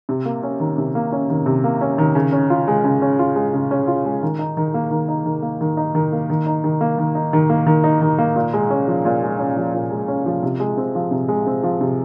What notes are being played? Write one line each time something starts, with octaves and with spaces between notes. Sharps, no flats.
C3
A#3
C#4
D#3
C3
A#3
C#4
D#3
C3
A#3
C#4
D#3
C#3
C#4
F4
G#3
C#3
C#4
F4
G#3
C#3
C#4
F4
G#3
D#3
D#4
D#3
A#3
D#3
D#4
D#3
A#3
D#3
D#4
D#3
A#3
D#3
D#4
D#3
A#3
D#3
D#4
D#3
A#3
D#3
D#4
D#3
A#3
A#2
G#3
C#4
F3
A#2
G#3
C#4
F3
A#2
G#3
C#4
F3
C3
G#3
C4
F3
C3
G#3
C4
F3
C3